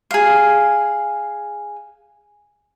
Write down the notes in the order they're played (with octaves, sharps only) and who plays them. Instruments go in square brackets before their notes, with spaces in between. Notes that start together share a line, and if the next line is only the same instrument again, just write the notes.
[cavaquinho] G#4 F5